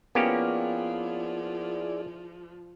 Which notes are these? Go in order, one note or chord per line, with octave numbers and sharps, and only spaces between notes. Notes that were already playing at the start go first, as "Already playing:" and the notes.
F3 A#3 B3 C#4 E4 G4 G#4 D5